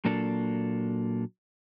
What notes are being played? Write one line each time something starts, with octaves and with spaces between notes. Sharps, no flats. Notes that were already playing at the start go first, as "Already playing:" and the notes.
A#2 F#3 A#3 D4 A4